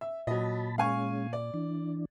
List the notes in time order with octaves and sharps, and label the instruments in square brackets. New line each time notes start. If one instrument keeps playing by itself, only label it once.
[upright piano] E5
[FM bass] A#2 [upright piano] F#3 D#5 [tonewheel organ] A5 B5
[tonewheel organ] G#3 C#4 [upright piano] F5 G#5 C#6
[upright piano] D5
[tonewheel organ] E3 D4